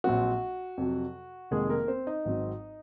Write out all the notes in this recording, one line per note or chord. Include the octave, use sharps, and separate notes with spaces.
A#1 A#2 F#3 C4 F#4
F2 C3 F#3
F1 F2 D#3 G#3 A#3 G#4
A#3 A#4
C4 C5
D#4 D#5
G#1 G#2 F#3 C4